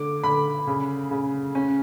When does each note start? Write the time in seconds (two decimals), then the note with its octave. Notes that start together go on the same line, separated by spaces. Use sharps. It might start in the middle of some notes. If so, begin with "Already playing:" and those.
Already playing: D3 D6
0.24 D3 B5
0.67 C#3
1.11 C#3
1.55 C#4